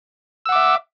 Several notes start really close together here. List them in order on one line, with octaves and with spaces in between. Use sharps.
E6 F#5 D6 E5